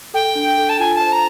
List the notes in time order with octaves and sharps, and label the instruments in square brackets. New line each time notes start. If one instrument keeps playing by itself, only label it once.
[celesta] A4 [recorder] G5
[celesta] D4
A4
[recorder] A5
[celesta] F4 [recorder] G#5
[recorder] A5
[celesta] C5
[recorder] A#5